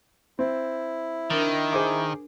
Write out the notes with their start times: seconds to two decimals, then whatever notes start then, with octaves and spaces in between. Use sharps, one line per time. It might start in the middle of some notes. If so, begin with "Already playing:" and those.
0.39 C4 E4
1.30 D#3 D4 A#4 A6
1.73 G#4 C5 D6